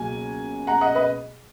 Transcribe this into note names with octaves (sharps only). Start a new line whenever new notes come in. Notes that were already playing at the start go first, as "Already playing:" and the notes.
Already playing: C#2 B2 F#3 A#3 G#5
F#5 A#5
D#5 F#5
B4 D#5